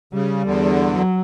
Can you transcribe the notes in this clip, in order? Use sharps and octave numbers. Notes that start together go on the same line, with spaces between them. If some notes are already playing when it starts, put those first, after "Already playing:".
C#3 G3
E2 D3
F#3